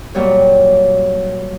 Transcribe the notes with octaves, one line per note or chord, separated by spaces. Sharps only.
A#2 F#3 G3 C#5